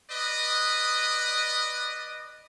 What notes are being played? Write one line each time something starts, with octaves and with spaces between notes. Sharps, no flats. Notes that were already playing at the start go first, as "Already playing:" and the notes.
B4 D5 D#5